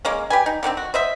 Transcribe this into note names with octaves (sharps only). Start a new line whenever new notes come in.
G#3 A#3 C#4
G4 B4 G#5
D#4
D3 D#3 G#3 C4
F#4
C5 D#5 E5